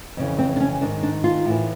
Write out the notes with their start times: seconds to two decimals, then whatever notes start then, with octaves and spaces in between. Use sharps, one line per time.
0.17 F2 C#3 E3
0.38 C4
0.56 D4
0.60 C#4
0.81 G#2 D#3 D4
1.03 D4
1.24 F4
1.46 A2 E3